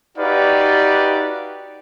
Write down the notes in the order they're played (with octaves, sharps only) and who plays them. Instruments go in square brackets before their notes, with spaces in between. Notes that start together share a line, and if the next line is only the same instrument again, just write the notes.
[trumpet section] D#4 F#4 G4 B4 D5 F5